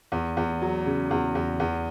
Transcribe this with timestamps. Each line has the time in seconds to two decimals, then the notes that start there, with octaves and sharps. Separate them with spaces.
0.12 E2
0.37 E2
0.62 F#3
0.86 C#3
1.11 E2
1.35 E2
1.60 E2